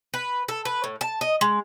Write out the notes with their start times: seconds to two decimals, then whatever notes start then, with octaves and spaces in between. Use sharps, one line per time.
0.14 B4
0.48 A4
0.65 B4
0.84 A2
1.01 A5
1.21 D#5
1.41 G#3